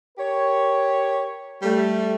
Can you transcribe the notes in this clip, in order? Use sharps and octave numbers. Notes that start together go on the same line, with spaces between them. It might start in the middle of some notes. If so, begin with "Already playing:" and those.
G4 A#4 C#5
G3 A3